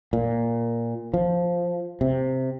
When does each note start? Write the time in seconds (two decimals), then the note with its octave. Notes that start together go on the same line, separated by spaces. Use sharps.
0.13 A#2
1.14 F3
2.01 C3